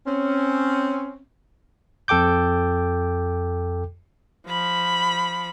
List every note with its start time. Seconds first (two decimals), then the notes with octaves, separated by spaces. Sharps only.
0.06 C4 C#4
2.08 F2 A4 G5 D6 G6
4.47 F3 B5